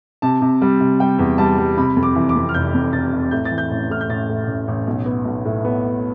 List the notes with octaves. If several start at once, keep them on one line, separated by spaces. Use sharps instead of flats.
C3 A5
C3
G3
C3
G3 G5
E2
G3 A5
G3
C3 B5
F2
D6
E3
D6
F2
F6
F1 G6
F2
C3 A6
C3
A2 G6
A6
E3
G6
A1
A2 F6
G6
A1 A6
A2
A1
A1
B1
B3
B1
A2
B3